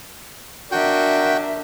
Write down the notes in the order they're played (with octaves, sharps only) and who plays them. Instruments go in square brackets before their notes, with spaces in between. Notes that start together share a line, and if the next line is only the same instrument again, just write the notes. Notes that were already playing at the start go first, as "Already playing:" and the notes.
[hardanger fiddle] D4 [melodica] F#4 G5 [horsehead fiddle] A#4 E5